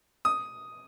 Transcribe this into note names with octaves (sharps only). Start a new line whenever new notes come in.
D#6